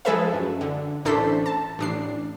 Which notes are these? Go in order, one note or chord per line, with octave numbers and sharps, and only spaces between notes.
F3 G#3 G#4 A4 B4 E5
F#2
D3
A1 A3 D4 A4 C5 B6
A5
A1 D4 C7